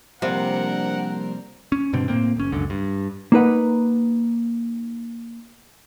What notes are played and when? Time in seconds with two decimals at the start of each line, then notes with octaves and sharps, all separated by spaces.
0.22 C3 F3 G3 A#3 C4 D4 A#4 F#5
1.72 C#4
1.93 G2 B2 D3 C4
2.08 A2 A#3 C4
2.37 F#1 C#4
2.52 F#1 C#2 F#2 D3
2.70 G2
3.32 A#3 D#4 B4 F#5